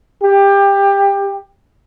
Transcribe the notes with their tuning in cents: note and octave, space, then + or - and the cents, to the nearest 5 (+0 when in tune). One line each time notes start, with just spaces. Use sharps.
G4 +20